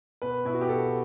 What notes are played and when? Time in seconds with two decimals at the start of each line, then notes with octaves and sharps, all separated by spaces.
0.22 B2 B4
0.45 B2 E4
0.54 F#4
0.61 G4
0.69 B2 A4